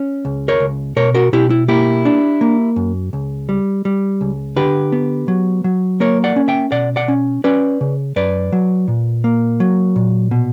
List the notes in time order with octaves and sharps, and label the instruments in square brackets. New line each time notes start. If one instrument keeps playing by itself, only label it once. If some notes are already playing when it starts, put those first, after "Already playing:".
Already playing: [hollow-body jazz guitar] C#4
C#2
A#4 C#5
C#2
B2 A#4 C#5
F#4 A#4
B2 E4 G4
E4
A#3 E4 G4
D4
A#3
F#2
C#2
G3
G3
C#2
D3 G4 B4
B3
F#3
F#3
A#3 A#4 C#5
D5 F#5
C#4
E5 G5
B2 D5 F#5
D5 F#5
C#4
C#4 B4 D5
C#3
F#2 B4 D5
F#3
A#2
A#3
F#3
A#2
B2